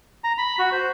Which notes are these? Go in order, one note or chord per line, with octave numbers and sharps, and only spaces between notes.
A#5
B5
F#4
C5